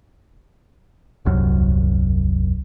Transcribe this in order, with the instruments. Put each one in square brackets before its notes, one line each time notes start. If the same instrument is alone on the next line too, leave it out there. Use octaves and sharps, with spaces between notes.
[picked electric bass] D#1 C2 F#2